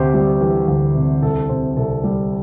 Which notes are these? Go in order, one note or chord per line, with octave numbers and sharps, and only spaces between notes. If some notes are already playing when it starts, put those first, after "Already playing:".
Already playing: D2 C3 G4 C5
G3 G4
E3 G4
D2
C3
C2 A4
C3 C5
C2 A4
G3